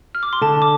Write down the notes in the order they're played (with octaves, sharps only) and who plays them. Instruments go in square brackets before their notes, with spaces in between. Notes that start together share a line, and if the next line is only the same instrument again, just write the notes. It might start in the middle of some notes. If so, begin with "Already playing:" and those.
[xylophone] F6
D6
C6
[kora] D3 [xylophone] A5
[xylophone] D6